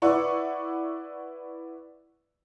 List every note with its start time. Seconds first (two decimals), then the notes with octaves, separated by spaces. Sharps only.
0.02 E4 B4 D5 F#5 C#6 E6